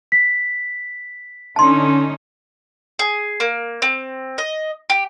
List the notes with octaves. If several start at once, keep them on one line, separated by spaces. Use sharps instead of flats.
B6
D3 C#4 D#4 A5 C6
G#4
A#3
C4
D#5
G4